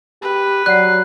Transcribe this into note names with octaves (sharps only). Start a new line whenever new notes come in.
G4 B4
F#3 D5 F#5 F#6 C7